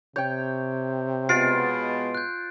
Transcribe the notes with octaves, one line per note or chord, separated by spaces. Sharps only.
C3 C#5 G5 G6
B2 G#3 B3 F4 A6 C7 D7
F#6 G6